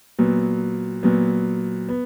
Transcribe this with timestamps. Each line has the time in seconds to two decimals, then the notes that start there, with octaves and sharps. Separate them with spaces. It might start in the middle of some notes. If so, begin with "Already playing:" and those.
0.19 A#2 F#3 B3
1.03 A#2 F#3 B3
1.89 B3